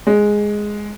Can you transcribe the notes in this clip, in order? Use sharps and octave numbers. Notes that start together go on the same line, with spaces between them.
G#3